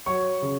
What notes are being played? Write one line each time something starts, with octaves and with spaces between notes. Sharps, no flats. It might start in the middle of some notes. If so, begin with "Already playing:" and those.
F#3 C#5 C#6
C#3